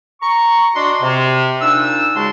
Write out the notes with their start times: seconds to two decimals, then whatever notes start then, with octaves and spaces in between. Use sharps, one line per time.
0.22 A#5 C#6
0.75 D4 F#4 D5 D#5 C6
1.02 C3
1.61 A#2 D4 D#4 E6
2.16 C#2 C#3 G#3 F#4 A5 C6